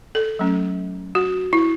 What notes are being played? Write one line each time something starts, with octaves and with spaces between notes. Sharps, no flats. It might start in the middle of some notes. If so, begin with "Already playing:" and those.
A4
F#3 A3 C#4
F#4
E4